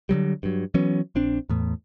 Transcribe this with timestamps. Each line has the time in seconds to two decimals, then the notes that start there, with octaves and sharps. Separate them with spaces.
0.09 D3 D#3 F#3 G3
0.43 G2 F#3
0.74 E3 F#3 B3 C#4
1.15 A#1 C4 D4
1.50 E2 A2